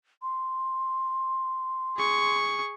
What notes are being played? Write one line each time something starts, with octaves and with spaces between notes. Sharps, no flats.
C6
G#4 C#6